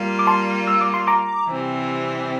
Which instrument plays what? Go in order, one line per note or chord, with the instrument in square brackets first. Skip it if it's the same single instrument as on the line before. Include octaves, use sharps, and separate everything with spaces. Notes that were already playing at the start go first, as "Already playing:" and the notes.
Already playing: [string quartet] G3 A#3 F4
[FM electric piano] D6
A5 C6
E6
D6
C6
A#5 D6
[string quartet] C3 E3 G3 C4